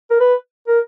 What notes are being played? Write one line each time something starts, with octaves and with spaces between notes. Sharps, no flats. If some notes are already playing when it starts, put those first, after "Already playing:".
A#4
B4
A#4